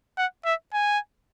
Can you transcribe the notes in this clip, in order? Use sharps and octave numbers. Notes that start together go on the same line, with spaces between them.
F#5
E5
G#5